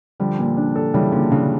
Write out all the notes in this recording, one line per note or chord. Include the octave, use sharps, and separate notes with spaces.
D3 F3 G3
A#2
D4
A4
C#3 E3 G3
A#2 D3
C#3 D4